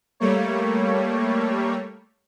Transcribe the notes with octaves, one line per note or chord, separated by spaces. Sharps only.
G3 A3 A#3 C#5